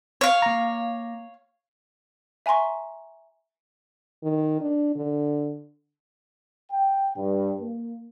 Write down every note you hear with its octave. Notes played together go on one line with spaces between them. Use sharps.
C#5 F5
A#3 A#5
E5 G#5 A#5 C6 C#6
D#3
D4
D3
G5
G2
A#3